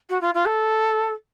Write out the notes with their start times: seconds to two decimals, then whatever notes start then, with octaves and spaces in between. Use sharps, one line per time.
0.09 F#4
0.21 F4
0.34 F4
0.45 A4